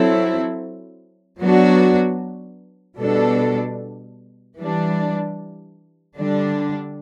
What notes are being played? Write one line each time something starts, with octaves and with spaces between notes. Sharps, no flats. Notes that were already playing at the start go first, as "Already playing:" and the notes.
Already playing: F#3 C4 E4 A4
F#3 B3 D4 F#4
B2 G3 D4 A4
E3 G3 D4
D3 G3 D4